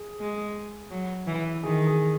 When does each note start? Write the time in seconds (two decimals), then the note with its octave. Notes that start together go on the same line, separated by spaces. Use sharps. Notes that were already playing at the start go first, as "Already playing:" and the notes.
Already playing: G#4
0.20 G#3
0.91 F#3
1.27 E3
1.63 D#3 G#4
1.87 G#4